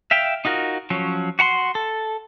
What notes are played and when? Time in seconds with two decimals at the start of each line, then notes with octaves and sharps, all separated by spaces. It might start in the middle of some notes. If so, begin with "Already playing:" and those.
0.11 E5 F5 G5
0.45 D#4 F4 F#4 A#4
0.90 F3 F#3 C#4
1.39 F#4 F#5 A#5 C6
1.75 A4